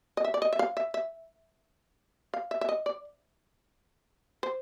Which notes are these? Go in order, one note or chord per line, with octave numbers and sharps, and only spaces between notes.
D#5
E5
D5
D#5
E5
F5
E5
E5
F5
E5
E5
D#5
D5
C5